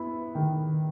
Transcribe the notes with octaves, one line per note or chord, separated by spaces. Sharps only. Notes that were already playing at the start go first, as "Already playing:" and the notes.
Already playing: B3 E4
D#3